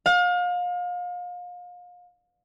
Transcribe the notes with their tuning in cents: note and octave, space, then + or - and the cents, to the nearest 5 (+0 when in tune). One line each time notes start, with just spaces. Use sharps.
F5 +35